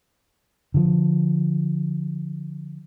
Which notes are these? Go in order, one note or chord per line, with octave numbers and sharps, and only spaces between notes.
D3 F3